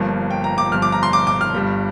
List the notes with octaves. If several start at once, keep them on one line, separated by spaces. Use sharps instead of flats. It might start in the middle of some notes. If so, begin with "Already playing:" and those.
Already playing: G1 G2 F3 A#3
G5
A#5
D6
G1 G2 F3 F6
D6
A#5
C6
D6
D6
F6
G1 G2 G3